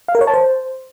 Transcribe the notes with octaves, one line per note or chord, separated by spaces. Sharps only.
F5
A#4
C#5
A5
C5